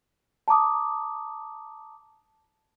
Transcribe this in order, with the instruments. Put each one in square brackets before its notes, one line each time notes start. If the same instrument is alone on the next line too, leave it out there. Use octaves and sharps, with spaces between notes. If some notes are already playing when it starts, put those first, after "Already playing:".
[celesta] A5 A#5 D6 D#6